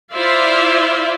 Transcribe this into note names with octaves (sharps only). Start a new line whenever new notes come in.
E4 F4 C5 D5 E5 F5